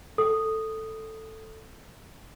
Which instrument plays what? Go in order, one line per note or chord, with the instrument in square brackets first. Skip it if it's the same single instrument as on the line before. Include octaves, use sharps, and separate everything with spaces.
[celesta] A4 D#6